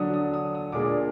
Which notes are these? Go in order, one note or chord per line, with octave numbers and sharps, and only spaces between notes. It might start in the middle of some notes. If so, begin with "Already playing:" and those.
Already playing: D3 F#3 D4 D#6
D#6
D#6
D#6
A#2 G#3 D4 D6